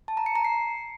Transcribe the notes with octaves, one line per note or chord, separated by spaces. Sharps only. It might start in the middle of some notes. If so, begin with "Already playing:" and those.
A5
A#5
C#7
A#5
C7